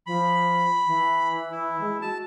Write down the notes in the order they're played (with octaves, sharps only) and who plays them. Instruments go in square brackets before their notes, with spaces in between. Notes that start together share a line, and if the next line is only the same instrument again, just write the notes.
[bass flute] F3 [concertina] B5
[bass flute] E3
[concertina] E4
[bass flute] G#3
[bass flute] F#4 [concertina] A5